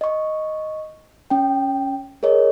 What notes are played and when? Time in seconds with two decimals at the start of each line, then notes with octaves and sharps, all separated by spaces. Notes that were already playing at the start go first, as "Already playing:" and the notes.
0.01 D#5 C#6
1.30 C#4 G5
2.23 G#4 A#4 C#5 D#5